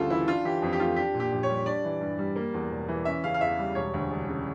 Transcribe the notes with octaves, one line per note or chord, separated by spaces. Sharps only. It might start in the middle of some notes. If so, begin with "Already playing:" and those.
Already playing: D2 C#3 G3 F4 A4
E3 E4
D4 F4
E3 G4
F2
G4
A3 F4
D4 G4
A#2
G4
A#1
C#5
G3
D4 D5
E3
G2
G3
A#3
E2
E1
E3
C#4 E5
C#3 F5
F5
E2 E5
G3
E1 C#5
D2
E1
C#3